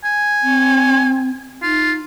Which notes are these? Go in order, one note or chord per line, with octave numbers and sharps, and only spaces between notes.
G#5
C4
D#4 F4